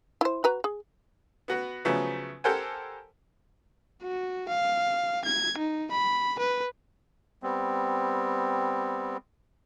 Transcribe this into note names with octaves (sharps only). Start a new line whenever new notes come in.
E4 C5
F#4 B4 A#5
G#4
B3 F#4 B4
C#3 F3 F#3 A3 B3
G4 A4 A#4 C5 F#5 G#5
F#4
F5
G#6
D#4
B5
B4
G3 B3 C4